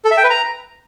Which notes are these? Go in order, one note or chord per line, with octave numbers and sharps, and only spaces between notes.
A4
E5
G5
B4
A#5